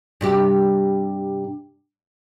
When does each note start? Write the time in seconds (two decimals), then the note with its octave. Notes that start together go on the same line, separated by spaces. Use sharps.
0.21 G2 C3 G4